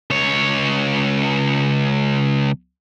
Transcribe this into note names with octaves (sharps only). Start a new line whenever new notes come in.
C#2 C#5